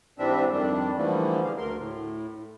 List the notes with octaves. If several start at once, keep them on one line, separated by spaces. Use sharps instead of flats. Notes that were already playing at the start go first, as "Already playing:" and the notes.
G#2 E3 G3 C4 D4 E5
F2 D#3 G3 D4
D3 E3 F3 G3 A3 A#3
C#3 F5
D2 A#4 C6
A2